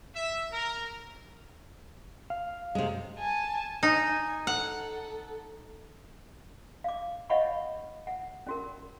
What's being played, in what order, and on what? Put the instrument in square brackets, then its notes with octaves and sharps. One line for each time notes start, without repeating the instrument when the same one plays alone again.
[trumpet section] E5
A#4
[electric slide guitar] F5
[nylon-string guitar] C3 G#3
[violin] G#5 A5
[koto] D#4 [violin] G#5
[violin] A4 [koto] F#5
[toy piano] F5 D6
C#5 D#5 F5 F#5 B5 C#6
F#5
C#4 F#4 A#4